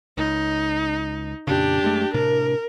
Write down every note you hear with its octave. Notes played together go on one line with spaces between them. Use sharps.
C#2 D#4
F2 A#2 C#3 D4 G4
F#2 G#3 A3
A2 C3 D4 A#4